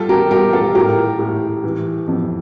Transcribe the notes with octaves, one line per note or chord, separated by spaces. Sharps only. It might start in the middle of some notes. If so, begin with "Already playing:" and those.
Already playing: G3 F4 A4
G4 A#4
G3 G4 A#4
F4 A4
A2 G4 A#4
A2
E3
F2